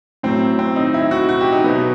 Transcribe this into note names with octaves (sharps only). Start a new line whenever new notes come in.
A2 F#3 C4
C4
D#4
E4
F#4
F#4
G4
D#4
B2 F#3 B3